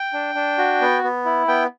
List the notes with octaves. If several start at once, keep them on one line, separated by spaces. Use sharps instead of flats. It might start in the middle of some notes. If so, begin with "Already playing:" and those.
Already playing: G5
D4
D4
F#4
B3
B3
E4
B3 G5